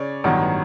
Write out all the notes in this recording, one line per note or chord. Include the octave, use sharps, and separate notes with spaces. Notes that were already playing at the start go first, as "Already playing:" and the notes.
Already playing: C#3 C#5 D5
A1 G2 D#3 F#3 B3